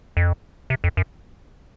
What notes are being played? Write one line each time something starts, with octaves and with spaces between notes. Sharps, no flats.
F2
C3
F2
F#2